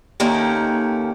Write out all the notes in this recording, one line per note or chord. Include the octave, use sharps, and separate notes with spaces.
D#2 D#3 A3 A#3 C#4